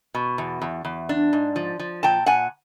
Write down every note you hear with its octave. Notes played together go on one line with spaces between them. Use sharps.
B2
E2
E2
E2
D4
G#2
F3
F3
A#2 G5 A5
A#2 F#5 G#5